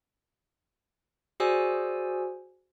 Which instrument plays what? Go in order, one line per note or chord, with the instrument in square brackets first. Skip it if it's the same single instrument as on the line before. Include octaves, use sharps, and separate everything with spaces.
[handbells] F#4 G#4 C5 D5 G#5 E6